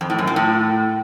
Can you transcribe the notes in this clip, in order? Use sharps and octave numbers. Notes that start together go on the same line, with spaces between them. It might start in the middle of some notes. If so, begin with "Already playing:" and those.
F2
A2
F#2
A#2
A2